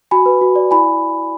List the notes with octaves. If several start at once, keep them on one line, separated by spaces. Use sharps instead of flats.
F#4 G#5 B5
B4
F#4
D5
E4 G#5 B5